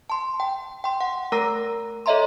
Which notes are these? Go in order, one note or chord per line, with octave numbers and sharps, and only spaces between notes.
A5 C6
G5
G5 C6
F#5
A3 A#4 A#5 E6 A#6
A4 C#5 D#5 E5 A#5 C6